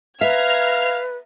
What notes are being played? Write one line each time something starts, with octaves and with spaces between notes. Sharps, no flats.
B4 E5 F5 A#5 F6 G#6